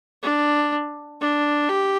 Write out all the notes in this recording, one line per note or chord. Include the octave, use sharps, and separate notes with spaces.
D4
D4
G4